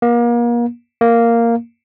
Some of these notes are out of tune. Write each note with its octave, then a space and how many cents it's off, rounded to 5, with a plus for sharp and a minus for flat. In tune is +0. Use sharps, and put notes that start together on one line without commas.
A#3 +35
A#3 -5